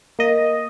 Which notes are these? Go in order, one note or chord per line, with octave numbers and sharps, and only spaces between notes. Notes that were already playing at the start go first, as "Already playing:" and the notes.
A#3 D#5